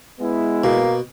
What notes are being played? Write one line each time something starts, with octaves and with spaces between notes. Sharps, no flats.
G#3 B3 E4
B2 A#3